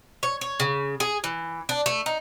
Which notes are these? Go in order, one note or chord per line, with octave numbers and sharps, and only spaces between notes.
C#5
C#5
C#3
G#4
E3
D4
A3
D#4